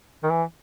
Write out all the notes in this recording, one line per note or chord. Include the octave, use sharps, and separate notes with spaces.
D#3
E3